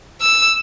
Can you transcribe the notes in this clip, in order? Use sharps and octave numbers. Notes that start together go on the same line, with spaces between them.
E6